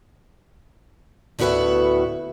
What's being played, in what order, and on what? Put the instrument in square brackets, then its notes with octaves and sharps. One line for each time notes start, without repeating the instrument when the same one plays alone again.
[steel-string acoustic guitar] D2 A2 B3 F#4 B4 E5